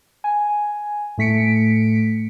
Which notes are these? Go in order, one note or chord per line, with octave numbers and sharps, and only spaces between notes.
G#5
A2 A3 B6 C#7 D7